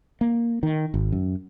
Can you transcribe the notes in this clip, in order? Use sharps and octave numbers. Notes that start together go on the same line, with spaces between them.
A#3
D#3
G#1
F#2